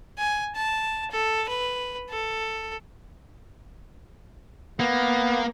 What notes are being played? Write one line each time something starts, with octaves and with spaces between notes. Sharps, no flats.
G#5
A5
A4
B4
A4
A#3 B3